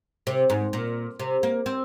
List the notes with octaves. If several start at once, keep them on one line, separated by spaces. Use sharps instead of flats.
C3
G#2
A#2
C3
A#3
C4